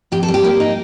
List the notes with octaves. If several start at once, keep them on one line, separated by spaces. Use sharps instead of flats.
F2 G4
A4
G3
G4
A#3
D#4